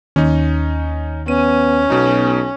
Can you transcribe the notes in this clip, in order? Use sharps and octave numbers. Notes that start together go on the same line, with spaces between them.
D#2 C#4 D#4
B3 C#4 D#7
B1 B2 D#4